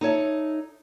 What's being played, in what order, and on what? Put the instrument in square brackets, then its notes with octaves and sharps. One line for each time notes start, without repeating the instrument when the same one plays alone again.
[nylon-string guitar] D#4 A4 C#5 E5